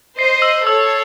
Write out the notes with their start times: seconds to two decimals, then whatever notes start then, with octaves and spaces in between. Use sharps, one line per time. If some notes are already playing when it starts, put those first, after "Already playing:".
0.19 C5 D#5 C7
0.42 E6
0.67 A4 C#5 E6